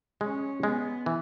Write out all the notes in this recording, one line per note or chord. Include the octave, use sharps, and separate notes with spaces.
G#3 C#4
G#3 B3
E3